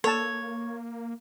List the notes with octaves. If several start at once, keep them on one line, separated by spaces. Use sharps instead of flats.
A#3 A4 C#5 A5